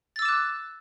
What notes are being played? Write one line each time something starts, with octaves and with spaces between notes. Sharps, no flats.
D6 E6 F#6 A6 E7